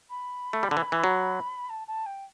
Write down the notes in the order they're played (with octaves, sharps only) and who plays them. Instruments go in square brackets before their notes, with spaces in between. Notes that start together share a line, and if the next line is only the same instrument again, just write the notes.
[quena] B5
[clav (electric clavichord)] A3
G3
D3
E3
E3
F#3
[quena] A5
A5
G5